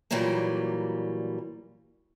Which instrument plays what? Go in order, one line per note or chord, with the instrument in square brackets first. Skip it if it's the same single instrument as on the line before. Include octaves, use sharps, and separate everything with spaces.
[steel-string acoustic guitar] A#2 E3 F#3 G3 A#3